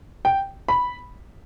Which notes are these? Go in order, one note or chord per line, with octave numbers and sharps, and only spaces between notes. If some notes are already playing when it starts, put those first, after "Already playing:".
G5
B5